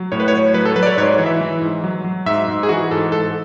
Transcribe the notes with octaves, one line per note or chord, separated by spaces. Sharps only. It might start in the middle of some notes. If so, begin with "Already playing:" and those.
Already playing: F#3
A2 C#5
B4
C#5
F#3
F#3 B4
A4
F#3 B4
D5
C#5
B4
G#2 C#5
E3
E5
E3
G#2
F#3
F#3
G#2 E5
G#2
G#4
E3 F#4
G#2 A4
G#2 A4